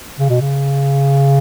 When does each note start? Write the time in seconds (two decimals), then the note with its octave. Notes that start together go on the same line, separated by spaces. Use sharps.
0.20 C#3
0.29 B2
0.41 C#3